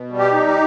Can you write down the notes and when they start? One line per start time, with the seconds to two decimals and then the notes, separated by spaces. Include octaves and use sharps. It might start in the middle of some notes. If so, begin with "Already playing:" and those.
Already playing: B2
0.11 G3
0.18 G4
0.33 D#4
0.47 G4